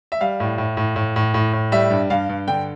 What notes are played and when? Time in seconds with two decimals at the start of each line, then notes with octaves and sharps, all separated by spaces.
0.12 E5
0.21 G3 F5
0.40 A2
0.58 A2
0.77 A2
0.96 A2
1.16 A2
1.34 A2
1.53 A2
1.72 G3 E5
1.90 G2
2.10 G2 F5
2.29 G2
2.47 D3 G5